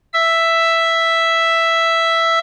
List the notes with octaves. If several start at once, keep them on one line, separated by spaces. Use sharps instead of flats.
E5 E6